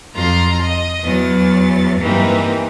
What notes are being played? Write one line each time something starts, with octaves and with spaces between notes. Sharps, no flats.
F2 F4 A#5 C6
D#5
E2 F#3 A6
G2 E3 A#3 C4 D#4 G4